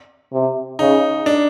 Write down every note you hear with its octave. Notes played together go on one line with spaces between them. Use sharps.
C3
C#3 D#4
D4